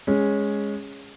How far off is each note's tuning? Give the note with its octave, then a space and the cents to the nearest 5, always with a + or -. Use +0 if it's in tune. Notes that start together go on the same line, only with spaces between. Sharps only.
G#3 -5 C#4 +0